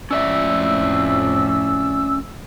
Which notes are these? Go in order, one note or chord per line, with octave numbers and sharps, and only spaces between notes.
F2 A2 C#4 D5 E5 E6